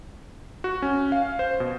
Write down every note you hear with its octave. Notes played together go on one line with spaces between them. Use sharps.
F#4
C#4
F5
C5
B2